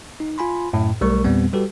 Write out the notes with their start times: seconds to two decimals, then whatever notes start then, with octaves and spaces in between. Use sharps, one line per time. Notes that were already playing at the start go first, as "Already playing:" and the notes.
0.20 D#4
0.38 F4 G#5 B5 C6
0.73 F#2 A2
1.01 B1 G3 A3 A#4 C#6
1.24 E2 A#2 G3 B3 C4
1.53 G3 F#4 G4 A4 B4